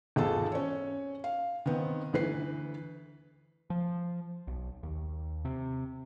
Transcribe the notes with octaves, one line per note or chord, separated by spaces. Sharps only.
G#1 E2 F4 G#4 A4 A5
C#4 C#5
F5
D#3 B3 C4
D2 E3 B4 C7
F3
B1
D#2
C3